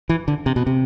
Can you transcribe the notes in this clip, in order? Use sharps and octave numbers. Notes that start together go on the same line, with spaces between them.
E3
D3
C3
B2
C3